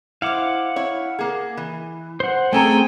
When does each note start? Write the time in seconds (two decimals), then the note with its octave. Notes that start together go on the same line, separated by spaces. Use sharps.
0.22 E4 C5 F5 F#5 D6
0.76 E4 C#5
1.19 A#3 G#4
1.57 E3
2.20 C5 F#5
2.53 A3 C4 C#4 G#4 A4 G5 G#5 A#5